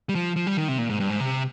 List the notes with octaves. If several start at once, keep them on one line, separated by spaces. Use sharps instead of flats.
G3
F3
F3
G3
D#3
C3
A#2
G#2
G2
G#2
C3